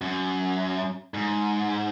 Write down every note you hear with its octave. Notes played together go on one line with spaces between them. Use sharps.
F#2
G#2